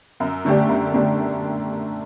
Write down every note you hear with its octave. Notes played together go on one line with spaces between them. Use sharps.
F#2
D3 A3 D4 G4
F#2
D3 A3 D4 G4